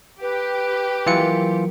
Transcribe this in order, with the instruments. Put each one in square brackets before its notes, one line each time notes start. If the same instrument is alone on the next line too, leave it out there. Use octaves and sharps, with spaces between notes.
[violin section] G4 [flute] B4
[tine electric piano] E3 F4 C#7 [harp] F#3 A#3